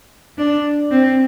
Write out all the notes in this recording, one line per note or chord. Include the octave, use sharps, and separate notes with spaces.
D4
C4